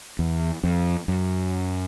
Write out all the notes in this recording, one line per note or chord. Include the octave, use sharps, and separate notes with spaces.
E2
F2
F#2